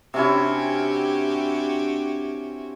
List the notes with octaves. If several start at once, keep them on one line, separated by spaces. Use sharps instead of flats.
C3 C#4 D4 E4 F#4 G4